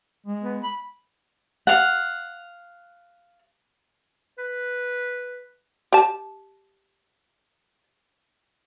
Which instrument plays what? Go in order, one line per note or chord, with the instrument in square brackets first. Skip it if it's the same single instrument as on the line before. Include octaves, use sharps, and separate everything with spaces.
[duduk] G#3
[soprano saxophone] B3
B5
[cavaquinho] F5 F#5
[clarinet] B4
[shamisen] G4 A5